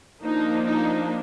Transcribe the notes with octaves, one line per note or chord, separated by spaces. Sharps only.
F3 A#3 D4 D#4
D#4